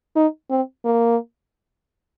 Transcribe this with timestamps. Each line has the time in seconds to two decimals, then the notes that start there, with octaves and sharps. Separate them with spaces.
0.16 D#4
0.51 C4
0.85 A#3